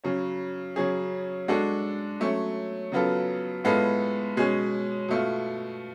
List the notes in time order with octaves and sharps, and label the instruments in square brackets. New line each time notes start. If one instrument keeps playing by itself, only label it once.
[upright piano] C#3 F#3 C#4
C#3 F#3 C#4 G#4
G#3 D4 F#4 A4
F#3 A3 C#4
C#3 F#3 B3 F4 A4
A2 G#3 B3 F4 A4
B2 G#3 C#4 G#4
B2 A3 F4